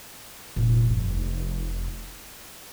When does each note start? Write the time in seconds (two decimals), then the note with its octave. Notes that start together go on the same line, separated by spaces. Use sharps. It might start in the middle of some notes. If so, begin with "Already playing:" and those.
0.56 F1 A#2
0.90 G2
1.16 D#4